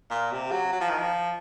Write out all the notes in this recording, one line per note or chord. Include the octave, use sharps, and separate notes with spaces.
A#2
C3
F#3
F#3
F3
D#3
F3